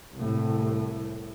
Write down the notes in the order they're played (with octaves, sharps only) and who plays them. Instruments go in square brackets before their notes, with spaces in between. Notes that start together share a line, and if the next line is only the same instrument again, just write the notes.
[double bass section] C2 A2